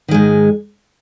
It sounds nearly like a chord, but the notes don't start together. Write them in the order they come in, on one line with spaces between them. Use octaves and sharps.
D#3 G#3 G#2